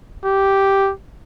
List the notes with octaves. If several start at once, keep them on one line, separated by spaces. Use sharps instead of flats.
G4